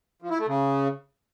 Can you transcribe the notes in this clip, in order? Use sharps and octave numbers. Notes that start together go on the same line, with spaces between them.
F3
E4
A3
C#3